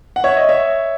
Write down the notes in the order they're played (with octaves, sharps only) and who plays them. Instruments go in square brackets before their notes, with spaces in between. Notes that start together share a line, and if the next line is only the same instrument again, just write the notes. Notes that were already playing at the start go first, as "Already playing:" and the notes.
[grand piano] F#5
C#5 E5
D#5
C#5 E5